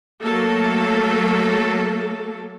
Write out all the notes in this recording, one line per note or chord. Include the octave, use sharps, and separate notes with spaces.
F#3 A3 A#3 A4